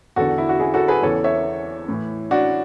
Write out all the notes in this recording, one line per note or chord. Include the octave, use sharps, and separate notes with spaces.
E2 D3 F#4 A4
E4
F#4
E4 G#4
F#4 A4
G#4 B4
E2 C#3 E3 A4 C#5
C#5 E5
A2 E3
D4 F#4